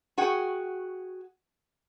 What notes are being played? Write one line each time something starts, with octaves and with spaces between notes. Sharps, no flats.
F#4 G#4 F#5 G5